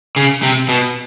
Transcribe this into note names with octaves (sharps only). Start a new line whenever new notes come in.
C#3
C3
B2